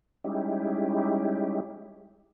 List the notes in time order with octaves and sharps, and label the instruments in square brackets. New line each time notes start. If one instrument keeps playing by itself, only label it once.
[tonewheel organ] G3 G#3 C#4 D#4 E4 G4